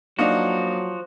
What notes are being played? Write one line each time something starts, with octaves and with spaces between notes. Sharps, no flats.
F3 F#3 A#3 D4 D#4 F#4